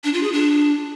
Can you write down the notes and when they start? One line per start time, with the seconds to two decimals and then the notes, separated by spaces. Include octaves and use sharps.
0.04 D4
0.14 F4
0.23 G#4
0.33 D4